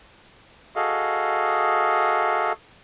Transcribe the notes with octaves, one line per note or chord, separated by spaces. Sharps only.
F#4 G#4 A4 D#5 F5